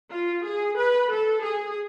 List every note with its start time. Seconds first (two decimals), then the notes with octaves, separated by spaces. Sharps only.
0.11 F4
0.44 G#4
0.77 B4
1.10 A4
1.43 G#4